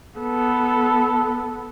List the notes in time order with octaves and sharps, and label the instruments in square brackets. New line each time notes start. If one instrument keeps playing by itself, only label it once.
[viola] B3 A4